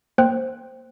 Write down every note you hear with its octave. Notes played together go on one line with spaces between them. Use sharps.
A#3 C5 G5 F#6